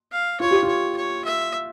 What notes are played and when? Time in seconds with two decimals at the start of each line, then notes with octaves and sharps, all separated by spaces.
0.12 F5
0.40 F4 C#5
0.51 G4
0.63 F4 C#5
0.96 C#5
1.24 E5